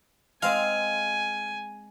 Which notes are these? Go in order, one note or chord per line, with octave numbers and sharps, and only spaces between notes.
G#3 C4 G#4 F5 G#5